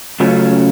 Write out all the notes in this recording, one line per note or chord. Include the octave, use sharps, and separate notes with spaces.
C#3 F#3 A3 C#4 F4